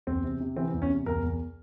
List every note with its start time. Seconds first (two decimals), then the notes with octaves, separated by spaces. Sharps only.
0.07 E2 C4
0.24 C3
0.40 C3
0.57 E3 C4
0.73 E2
0.82 C#4
0.90 C3
1.06 E2 A#4
1.23 E2